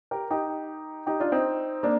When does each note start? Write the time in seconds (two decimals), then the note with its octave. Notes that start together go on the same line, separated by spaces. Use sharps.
0.11 G4 A#4
0.31 D#4 G4
1.06 D#4 G4
1.20 D4 F4
1.32 C4 D#4
1.83 A#3 D4